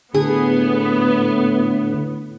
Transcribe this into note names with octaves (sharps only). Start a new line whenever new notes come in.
A2 D3 B3 G#4